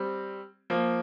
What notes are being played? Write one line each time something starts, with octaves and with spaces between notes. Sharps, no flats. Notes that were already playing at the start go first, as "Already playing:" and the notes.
Already playing: G3 C4
F3 A#3